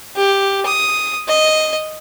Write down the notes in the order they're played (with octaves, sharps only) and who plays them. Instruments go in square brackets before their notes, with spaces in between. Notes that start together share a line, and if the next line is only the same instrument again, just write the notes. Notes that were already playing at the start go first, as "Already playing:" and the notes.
[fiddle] G4
D#6
D#5